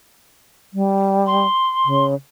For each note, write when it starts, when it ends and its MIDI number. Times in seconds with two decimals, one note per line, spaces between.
0.74 1.46 55
1.26 2.05 84
1.85 2.14 49